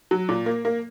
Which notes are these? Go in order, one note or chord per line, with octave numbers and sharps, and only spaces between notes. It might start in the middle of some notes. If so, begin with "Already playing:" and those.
F#3
A#2
A#3
A#3